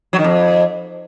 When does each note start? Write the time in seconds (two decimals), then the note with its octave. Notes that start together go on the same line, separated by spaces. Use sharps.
0.13 F#3
0.19 D#3
0.24 F2